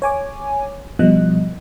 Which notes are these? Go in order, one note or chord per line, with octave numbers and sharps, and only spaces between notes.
C#5 G#5 D6
B2 F3 G3 D#5 F#6